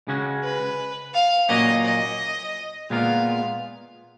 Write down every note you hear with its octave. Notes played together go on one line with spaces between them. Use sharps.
C#3 G#3 C#4 F#4
B4
F5
A#2 F#3 A#3 C#4 F#4 D#5
D#5
A#2 G#3 B3 F4 A#4 F5